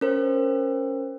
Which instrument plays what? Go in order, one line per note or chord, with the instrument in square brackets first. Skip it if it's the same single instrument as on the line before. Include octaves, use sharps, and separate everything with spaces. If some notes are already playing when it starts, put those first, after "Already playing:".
[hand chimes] C#4 A#4 C5